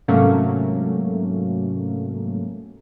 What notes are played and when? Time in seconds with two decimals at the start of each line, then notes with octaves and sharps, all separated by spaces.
0.08 G#2 C3 F#3 A3 A#3 C#4